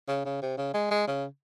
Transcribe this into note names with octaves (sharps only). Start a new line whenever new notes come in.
C#3
C#3
C3
C#3
G#3
G#3
C#3